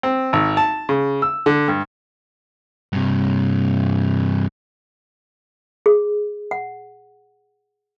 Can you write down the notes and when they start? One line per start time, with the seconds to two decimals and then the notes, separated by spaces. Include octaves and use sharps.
0.03 C4
0.33 G#1
0.57 A5
0.89 C#3
1.22 E6
1.46 D3
1.68 G2
2.93 G2 C3
5.86 G#4
6.51 F#5